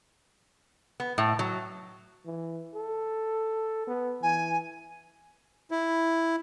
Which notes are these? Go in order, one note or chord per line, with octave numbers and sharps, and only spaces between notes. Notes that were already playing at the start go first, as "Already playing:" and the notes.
B3
A2
F#3
E3
A4
B3
E3 G#5
E4